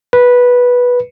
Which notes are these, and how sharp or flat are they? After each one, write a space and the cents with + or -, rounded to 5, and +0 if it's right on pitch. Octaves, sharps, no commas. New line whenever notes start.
B4 -10